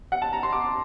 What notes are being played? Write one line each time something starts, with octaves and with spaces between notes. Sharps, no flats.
F#5
A5
A#5
C6
D6